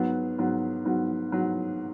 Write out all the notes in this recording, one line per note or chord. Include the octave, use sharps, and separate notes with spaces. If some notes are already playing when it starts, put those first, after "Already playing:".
Already playing: G#2 F#3 B3
G#2 F#3 B3
G#2 F#3 B3
G#2 F#3 B3